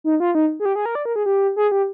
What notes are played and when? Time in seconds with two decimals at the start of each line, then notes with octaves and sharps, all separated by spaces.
0.04 D#4
0.20 F4
0.35 D#4
0.60 G#4
0.65 G4
0.76 G#4
0.86 A#4
0.95 D5
1.05 A#4
1.16 G#4
1.26 G4
1.56 G#4
1.72 G4